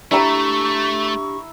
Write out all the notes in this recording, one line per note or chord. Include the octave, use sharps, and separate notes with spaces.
A3 D4 E4 G4 E5 A#5 C#6